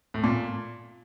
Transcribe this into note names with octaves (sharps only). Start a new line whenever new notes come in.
A2
A#2